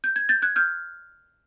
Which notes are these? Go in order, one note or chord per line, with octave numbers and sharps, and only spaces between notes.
G6
G#6
G6 A6
F#6 G#6
F6 G6